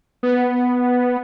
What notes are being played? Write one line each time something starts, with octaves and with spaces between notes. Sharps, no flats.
B3